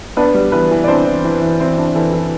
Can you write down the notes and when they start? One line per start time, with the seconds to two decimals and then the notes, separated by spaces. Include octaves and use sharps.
0.17 B3 D4 B4
0.34 G3
0.52 E3 B3 B4
0.71 E3
0.84 D5
0.88 C4 D4 C5
1.06 E3
1.25 E3
1.41 E3
1.60 E3 C4 C5
1.78 D4
1.95 E3 A4
2.13 E3